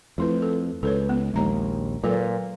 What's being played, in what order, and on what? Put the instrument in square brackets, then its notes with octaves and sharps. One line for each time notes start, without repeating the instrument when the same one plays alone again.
[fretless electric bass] F2 [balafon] A3 E4 B4
[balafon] A4
[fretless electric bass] C#2 [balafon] A4 B4 C#5
[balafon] B3
[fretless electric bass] A#1 D#2 [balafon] G#3 A#5
[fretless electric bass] A#2 [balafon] F#3 A4 B4